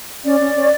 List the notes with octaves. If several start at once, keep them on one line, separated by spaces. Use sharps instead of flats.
C#4 D5
C#4
C#4